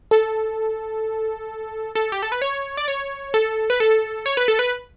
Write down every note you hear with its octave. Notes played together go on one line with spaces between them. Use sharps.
A4
A4
G4
A4
B4
C#5
D5
C#5
A4
B4
A4
C#5
B4
A4
B4